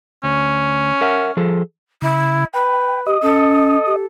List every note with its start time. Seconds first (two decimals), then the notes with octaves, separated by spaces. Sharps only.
0.24 D2 C#4
1.01 A#4 E5 F#5
1.37 F3 G#4 A4
2.02 C#3 E4
2.54 B4 G5
3.06 G4 D#5 D#6
3.22 C#4 A4
3.87 G4